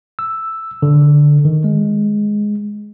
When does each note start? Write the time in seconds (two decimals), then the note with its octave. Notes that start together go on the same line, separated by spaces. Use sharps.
0.19 E6
0.82 D3
1.45 D#3
1.64 G#3